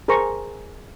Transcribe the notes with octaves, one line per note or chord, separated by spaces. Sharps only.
G#4 A#4 C5 A#5 C#6